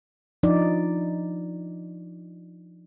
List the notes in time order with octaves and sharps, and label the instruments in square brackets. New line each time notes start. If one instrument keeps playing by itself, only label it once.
[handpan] F3 D4 D#4 D5